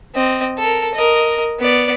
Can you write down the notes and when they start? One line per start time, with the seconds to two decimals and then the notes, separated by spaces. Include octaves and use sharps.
0.14 C4 D#5
0.59 A4 A#4
0.94 A#4 D#5
1.59 B3 D5